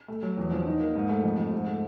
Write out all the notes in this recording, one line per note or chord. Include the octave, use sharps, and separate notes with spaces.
A3
F#3
E2
F3
D#4
A#3
G#2
A3
F2
F3
G#2
A3